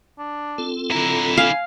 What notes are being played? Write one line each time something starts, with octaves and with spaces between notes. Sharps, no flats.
D4
C4 F4 A4
D3 E4 A#5
F5 G#5